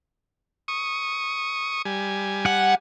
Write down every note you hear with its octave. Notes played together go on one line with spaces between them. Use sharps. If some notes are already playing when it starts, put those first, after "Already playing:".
C#6 D#6
G3 G#5
F#5